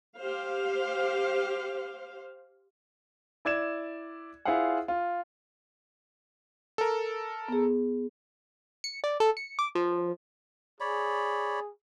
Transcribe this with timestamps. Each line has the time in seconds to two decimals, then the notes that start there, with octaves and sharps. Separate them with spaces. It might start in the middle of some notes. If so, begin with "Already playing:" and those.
0.19 G4 C5 F5
3.45 E4 D5 G#6 E7
4.45 E4 F4 G#4 C5 F5 F#5
4.88 F4
6.78 A4 A#4
7.48 B3 G#4
8.84 C#7
9.04 D5
9.20 A4
9.37 C#7
9.59 D6
9.75 F3
10.80 G#4 C#5 D5 B5